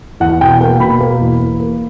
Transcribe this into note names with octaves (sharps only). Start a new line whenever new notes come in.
E2 F#5
B2 G5
A#3 G5
B2 B5
A#3
E2
A#3
A#3